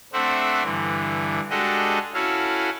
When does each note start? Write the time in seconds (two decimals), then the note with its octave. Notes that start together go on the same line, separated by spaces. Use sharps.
0.13 A3 C4 D4 C5 E5 F#5
0.63 G2 D3 E3
1.50 G#3 D4 F#4 G4 A4 D#5
2.14 C#4 E4 F#4 A4 F5